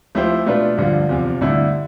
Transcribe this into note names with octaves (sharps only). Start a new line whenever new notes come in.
F3 A3 E4 G4 C5
B2 A3 D4 F4 B4
G2 D3 F3
E2 C3 F3
G2 D3 A3 E4